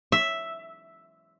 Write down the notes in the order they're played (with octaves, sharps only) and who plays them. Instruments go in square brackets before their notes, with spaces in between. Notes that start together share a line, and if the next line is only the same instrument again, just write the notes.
[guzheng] E5